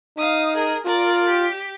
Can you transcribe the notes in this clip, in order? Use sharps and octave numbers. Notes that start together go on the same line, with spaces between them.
D#4 F5 D#6
G#4 A#4
F4 A#4 D5
G4